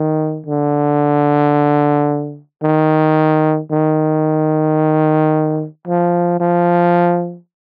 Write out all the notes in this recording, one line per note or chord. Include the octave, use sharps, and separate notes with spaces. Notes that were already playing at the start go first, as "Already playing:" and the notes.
Already playing: D#3
D3
D#3
D#3
F3
F3